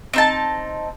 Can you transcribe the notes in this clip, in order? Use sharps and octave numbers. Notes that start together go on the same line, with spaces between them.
C4 D#4 A5